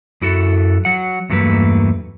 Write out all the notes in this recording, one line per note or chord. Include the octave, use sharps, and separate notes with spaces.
F#2 E4 F#4 A4
F#3 F#5
E2 G2 F#3 A3 A#3 B4